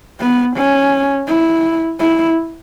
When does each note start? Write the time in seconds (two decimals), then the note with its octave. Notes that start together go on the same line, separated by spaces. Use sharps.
0.20 B3
0.57 C#4
1.28 E4
2.00 E4